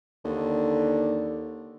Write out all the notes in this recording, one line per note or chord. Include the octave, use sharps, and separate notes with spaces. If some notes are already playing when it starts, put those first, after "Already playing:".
D#2 D3